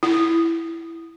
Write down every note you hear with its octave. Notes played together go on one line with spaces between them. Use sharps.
E4